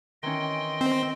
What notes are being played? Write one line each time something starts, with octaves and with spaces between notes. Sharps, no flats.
D#3 E3 C#4 D#5 G5 C6
C4